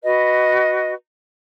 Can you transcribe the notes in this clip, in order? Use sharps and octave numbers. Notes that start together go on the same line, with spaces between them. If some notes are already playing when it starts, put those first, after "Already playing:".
F#4 B4 D#5